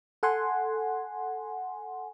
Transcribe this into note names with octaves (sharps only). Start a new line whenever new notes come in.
A4 F#5 G#5 C6